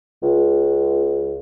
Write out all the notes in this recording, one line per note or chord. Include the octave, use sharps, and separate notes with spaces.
C#2